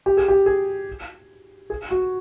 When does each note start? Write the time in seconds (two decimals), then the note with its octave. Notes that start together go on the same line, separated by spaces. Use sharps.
0.06 G4
0.17 G#4
0.28 G4
0.46 G#4
1.70 G#4
1.91 F#4